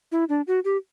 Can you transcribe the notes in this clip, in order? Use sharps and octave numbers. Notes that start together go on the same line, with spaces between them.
E4
D4
F#4
G4